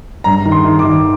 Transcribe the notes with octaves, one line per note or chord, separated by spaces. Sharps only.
G2 A#5
D#3
C6
D#3
D6
D#3